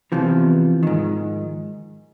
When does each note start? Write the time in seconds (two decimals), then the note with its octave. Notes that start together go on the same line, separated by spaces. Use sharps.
0.12 E2 C3 E3 F3
0.83 G#2 D#3